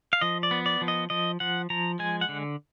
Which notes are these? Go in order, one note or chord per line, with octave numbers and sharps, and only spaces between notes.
F5
F3 D#5
D5
B3
D5
F3
D#5
F3 D#5
F3 F#5
F3 A#5
G#3 G#5
F#5
D3